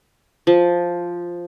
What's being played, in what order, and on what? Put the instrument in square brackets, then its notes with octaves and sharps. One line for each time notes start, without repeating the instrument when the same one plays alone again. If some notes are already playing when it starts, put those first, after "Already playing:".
[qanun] F3